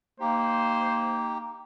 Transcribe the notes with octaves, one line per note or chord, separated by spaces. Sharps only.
A#3 D#4 G4 C5